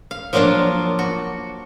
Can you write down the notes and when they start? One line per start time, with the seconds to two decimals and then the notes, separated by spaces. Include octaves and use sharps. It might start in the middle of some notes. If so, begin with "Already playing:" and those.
0.11 F5
0.33 F3 F#3 A#3 D4 F4
0.99 F#4